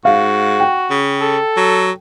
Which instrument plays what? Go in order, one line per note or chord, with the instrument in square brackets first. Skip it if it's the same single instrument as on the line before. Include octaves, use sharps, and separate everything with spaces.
[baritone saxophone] G#2 [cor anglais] F#4 [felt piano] F5
[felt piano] G5
[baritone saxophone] C#3
[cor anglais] A4
[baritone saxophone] F#3